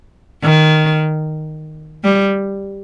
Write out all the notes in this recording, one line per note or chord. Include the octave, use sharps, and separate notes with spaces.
D#3
G3